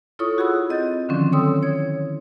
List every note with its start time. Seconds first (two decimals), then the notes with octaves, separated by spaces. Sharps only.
0.19 E4 F4 A4 C#5 C#6 D#6
0.38 F#4 G#4 F#5 B5 D#6 E6
0.69 C4 D#5 G6 A6
1.09 D3 D#3 F3 F#3 C4 C#4
1.32 A4 C#5 G5 C6 D#6 E6
1.62 E4 C#5 G#6